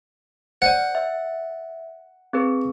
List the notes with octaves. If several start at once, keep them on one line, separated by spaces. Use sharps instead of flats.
C5 D5 F#5
E5
C4 G#4 B4